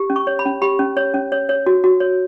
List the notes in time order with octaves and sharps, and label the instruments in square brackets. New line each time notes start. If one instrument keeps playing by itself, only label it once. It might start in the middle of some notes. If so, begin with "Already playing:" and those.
Already playing: [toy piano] G4
C#4
C#6
C#5
B5
C#4
G4 B5
C#4
C#5
C#4
C#5
C#5
F#4
F#4
C#5